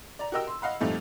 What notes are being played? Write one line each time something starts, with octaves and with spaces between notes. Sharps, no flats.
D5 A#5
F#4 G4 A#4 D#5 G5 E6
C6
D#5 F5 F#5 B5
F2 A#2 G3 A3 D#4